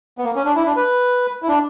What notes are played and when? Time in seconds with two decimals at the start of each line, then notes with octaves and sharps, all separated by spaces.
0.18 B3
0.24 A#3
0.35 C#4
0.45 D4
0.56 E4
0.65 D4
0.76 B4
1.43 E4
1.48 D4